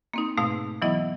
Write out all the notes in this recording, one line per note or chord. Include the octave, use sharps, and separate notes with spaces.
A#3 C4 D#4
G#2 B2 A3 F5 E6
E3 F#3 B3 E4 D#5